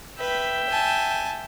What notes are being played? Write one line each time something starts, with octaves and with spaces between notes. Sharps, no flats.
B4 E5 G5
G#5 A5